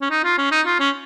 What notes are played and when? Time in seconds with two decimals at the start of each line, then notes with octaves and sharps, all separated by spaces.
0.02 C#4
0.10 D#4
0.24 F4
0.38 C#4
0.52 D#4
0.66 F4
0.80 C#4